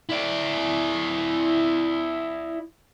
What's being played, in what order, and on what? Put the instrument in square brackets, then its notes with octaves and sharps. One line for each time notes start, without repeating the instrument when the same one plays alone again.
[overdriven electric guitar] E4 D5